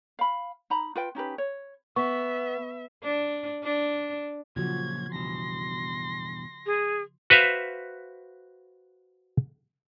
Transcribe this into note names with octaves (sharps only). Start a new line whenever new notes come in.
F5 B5
D#4 A#5 B5
F4 B4 G5
C#4 D#4 G4 B4
C#5
B3 E5 C#6
D4
D4
A#2 C#3 F3 F#3 F#4 G#6
E2 G2 B2 C6 A#6
G#4
F#4 B4 C5 E5 F5